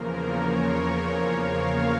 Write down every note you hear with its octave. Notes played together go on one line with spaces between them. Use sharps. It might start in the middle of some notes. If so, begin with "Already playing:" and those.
Already playing: E2 C#3 F3 A#3 A#4
C#5
F5